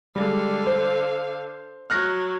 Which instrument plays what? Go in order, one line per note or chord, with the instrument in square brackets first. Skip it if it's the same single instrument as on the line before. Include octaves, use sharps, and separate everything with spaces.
[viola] D3 F5 [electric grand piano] G3 G#3
[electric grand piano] C5
[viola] F#3 [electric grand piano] F6 F#6 A#6